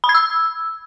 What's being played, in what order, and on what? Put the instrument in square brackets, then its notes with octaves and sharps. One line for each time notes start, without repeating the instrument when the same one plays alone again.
[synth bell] B5
G#6
E6